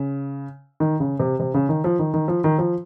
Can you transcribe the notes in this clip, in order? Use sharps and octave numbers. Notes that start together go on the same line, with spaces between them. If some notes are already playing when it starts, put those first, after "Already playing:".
Already playing: C#3
D#3
C#3
C3
C3
C#3
D#3
F3
D#3
D#3
F3
D#3
F3